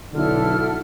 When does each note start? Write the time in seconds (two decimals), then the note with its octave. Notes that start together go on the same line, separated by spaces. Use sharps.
0.14 B1 D3 E4 A4 F6